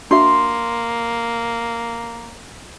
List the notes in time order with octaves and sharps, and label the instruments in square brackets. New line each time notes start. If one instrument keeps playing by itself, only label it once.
[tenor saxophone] A#3 [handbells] D4 F#4 E5 [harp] C6